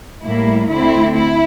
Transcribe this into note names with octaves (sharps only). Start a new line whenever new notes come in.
A2 G3 A#3 E4
D2 D3 A3 C4 E4
E4